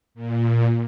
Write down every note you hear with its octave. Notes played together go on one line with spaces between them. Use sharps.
A#2